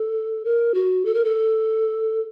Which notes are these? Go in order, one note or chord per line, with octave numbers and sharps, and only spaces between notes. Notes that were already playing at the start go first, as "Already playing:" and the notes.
Already playing: A4
A#4
F#4
A4
A#4
A4